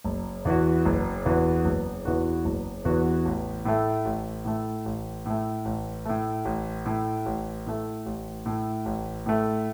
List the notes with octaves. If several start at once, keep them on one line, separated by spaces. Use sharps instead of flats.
F#1
E2 E3 B3 F#4
F#1
E2 E3 B3 F#4
F#1
E2 E3 B3 F#4
F#1
E2 E3 B3 F#4
A1
A2 A3
A1
A2 A3
A1
A2 A3
A1
A2 A3
A1
A2 A3
A1
A2 A3
A1
A2 A3
A1
A2 A3